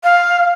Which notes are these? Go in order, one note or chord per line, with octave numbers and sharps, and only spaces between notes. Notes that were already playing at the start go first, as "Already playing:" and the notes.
F5